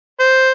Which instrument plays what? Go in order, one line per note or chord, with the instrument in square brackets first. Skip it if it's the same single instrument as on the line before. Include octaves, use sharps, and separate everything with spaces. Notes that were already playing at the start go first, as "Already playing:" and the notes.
[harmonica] C5